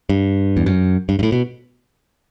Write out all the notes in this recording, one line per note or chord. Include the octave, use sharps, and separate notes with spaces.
G2
E2
F#2
G2
G2
A2
B2